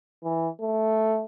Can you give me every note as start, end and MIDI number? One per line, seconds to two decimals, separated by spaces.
0.24 0.49 52
0.61 1.24 57